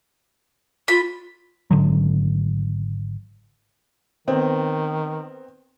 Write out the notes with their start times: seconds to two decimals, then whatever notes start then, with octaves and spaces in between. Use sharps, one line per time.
0.88 F4 B5
1.71 G#1 D3 F#3
4.27 D#3 B3 C4